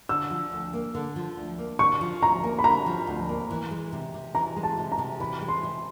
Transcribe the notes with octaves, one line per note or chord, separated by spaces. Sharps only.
D3 E6
F3
D2
A#3
D3
F3
D2
A#3
D3 C#6
F3
D2 A#5
A#3
B5
D3 A#5
F3
D2
A#3
E3
G#3
C3
C3
E3 A#5
G#3
A5
C3
A#5
C3
E3 B5
G#3
C6
C3